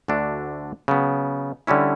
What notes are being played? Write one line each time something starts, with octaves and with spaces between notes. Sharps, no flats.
D2 D3 A3 D4 F#4
C#3 F#3 B3
D3 G3 C#4 E4